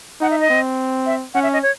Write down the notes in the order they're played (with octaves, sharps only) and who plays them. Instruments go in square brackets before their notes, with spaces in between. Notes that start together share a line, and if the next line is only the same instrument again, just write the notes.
[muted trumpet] D#4 [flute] F#5
[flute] E5
D#5
[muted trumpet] C4
[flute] E5
[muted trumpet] C#4 [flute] F#5
[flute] E5
D#5
C#5